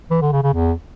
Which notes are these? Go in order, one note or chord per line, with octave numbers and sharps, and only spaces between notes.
E3
D3
C#3
C#3
E2